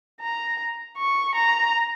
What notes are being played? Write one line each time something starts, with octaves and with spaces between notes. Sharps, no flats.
A#5
C#6
A#5